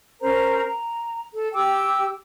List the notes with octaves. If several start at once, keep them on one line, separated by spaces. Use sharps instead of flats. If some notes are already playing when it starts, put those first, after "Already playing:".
C#4 A#4 C5 A#5
A#5
A4
G4 G5 D6 E6